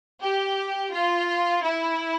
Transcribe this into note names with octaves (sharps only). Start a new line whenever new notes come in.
G4
F4
E4